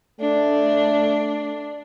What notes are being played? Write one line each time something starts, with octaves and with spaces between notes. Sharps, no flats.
A3 D4